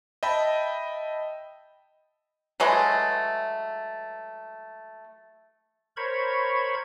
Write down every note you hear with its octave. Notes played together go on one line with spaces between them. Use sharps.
D#5 E5 G5 A5 B5
E3 F#3 G#3 A3
A#4 C5 C#5 B5 C#6 G#6